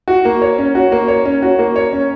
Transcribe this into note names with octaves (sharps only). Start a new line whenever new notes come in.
F#4
A#3
C#5
C#4
F#4
A#3
C#5
C#4
F#4
A#3
C#5
C#4